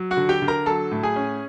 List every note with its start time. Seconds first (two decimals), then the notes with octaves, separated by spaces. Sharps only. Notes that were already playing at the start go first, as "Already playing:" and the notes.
Already playing: F#3
0.11 F#4 F#5
0.17 D3
0.29 G4 G5
0.42 D3
0.48 A#4 A#5
0.66 F#3 A4 A5
0.91 A2
1.03 G#4 G#5
1.16 C#4